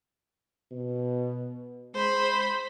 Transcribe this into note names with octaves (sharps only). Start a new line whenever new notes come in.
B2
G#3 C5 B5